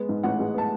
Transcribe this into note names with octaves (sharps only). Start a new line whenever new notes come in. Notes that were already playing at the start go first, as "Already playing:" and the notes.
Already playing: G#3 B3
G#2
A1 F#5
G#3
B3 A5